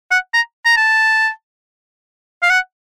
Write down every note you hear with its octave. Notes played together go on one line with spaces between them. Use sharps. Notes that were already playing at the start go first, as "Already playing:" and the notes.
F#5
A#5
A#5
A5
F5
F#5